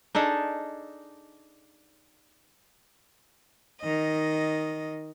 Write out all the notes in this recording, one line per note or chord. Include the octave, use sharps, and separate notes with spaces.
D4 D#4 G#4 A4
D#3 D#5